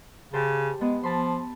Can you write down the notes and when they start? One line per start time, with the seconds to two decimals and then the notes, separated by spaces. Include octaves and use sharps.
0.33 C#3 G4 C5 A5
0.81 G#3 B3
1.03 F3 A5 B5 C6